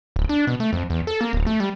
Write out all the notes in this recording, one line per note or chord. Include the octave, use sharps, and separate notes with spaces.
D1
D4
B2
A3
F2
E2
A4
A#3
D1
A3
G3